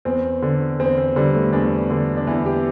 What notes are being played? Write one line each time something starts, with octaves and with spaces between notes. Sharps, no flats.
E2 C4
D3
E2 C4
C4
D3 G3
A3
E2 D4
D3
D4
E2 E4
G4